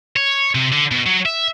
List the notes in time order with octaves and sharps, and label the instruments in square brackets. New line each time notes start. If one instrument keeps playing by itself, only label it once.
[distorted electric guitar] C#5
C3
D3
B2
F#3
E5